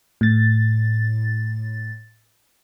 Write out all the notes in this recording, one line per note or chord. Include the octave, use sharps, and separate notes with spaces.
A2 A6